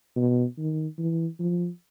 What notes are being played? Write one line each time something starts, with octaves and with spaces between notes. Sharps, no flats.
B2
D#3
E3
F3